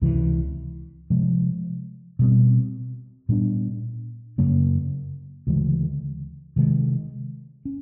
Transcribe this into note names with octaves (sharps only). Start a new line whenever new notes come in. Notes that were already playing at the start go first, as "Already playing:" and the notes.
C#2 C3 E3
C3 F3 G#3
B2 G3 C4
A#2 G3 B3 D4
F#2 C#3 F#3 A#3
D2 C#3 E3 G#3
C3 D#3 G#3
C#4